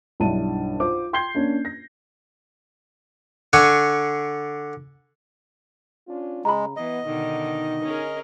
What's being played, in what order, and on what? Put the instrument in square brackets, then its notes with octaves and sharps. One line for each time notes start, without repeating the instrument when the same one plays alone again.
[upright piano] B1 G2 D4 E4 A5 D#7
F4 C5 D6
G5 C6 G6 G#6 C7 G7
A#3 C#4 D4
A#6
[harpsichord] D3 D4 G#5 C#6
[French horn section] C#4 D4 F4
[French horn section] C#3 [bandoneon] G#3 [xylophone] A#5 B5
[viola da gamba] E3 [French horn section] B3 [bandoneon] D#5
[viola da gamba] B2 D3 D#3 [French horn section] D#4
[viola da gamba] C#4 G#4 A#4